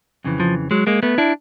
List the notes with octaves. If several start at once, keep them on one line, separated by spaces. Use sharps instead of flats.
F2 C#3 E3
F3
F#3 G#3
G#3 A#3
A3 B3
D4 E4